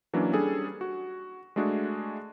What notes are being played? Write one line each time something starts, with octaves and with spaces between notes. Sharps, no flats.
E3 F#3 A#3 C#4 D4
G3 C#4 D4 G#4 A4
F#4
G#3 A3 D4 F#4 G#4